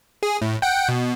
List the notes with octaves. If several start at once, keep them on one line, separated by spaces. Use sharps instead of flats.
G#4
A2
F#5 G5
B2